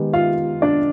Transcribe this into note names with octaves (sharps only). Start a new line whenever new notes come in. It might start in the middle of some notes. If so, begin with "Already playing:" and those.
Already playing: D#3 G#3 B3 G4
F4 F5
D4 D5